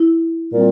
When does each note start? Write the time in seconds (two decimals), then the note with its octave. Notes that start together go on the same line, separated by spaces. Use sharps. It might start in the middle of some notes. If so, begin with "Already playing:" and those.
Already playing: E4
0.51 A#2 G3 C4 F4